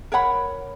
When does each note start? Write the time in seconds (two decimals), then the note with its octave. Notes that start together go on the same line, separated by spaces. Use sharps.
0.12 A#4 C#5 F#5 B5